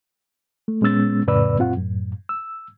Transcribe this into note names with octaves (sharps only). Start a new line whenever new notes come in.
A3
A#2 G#3 B3 C#4 E6 A6
F2 A2 C#3 B4 D5 E6
F#2 A#2 C4 F4 F#5
F#2 A2
E6